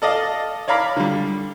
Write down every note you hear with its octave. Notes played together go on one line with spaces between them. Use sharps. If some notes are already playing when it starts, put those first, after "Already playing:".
A4 D5 D#5 F5 A5
C#5 D5 F5 A#5 B5 D6
D3 G3